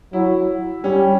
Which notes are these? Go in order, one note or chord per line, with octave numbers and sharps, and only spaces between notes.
F#3 E4
G3 C#4